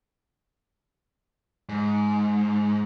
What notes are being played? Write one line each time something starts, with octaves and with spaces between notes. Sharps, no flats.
G#2